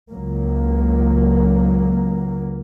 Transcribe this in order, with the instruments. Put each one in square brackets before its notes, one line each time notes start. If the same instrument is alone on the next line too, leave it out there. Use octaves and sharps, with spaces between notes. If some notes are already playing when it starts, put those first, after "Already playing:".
[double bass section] C#2 F#3 A#3